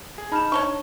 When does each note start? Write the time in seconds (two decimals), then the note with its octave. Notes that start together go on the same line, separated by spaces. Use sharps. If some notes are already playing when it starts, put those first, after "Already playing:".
0.18 G#4
0.32 D#4 A5 B5 F6 E7
0.52 D4 C#5 A5 C#6 G7